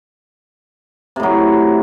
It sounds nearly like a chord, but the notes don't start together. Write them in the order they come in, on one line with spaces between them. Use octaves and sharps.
C3 A2 F#3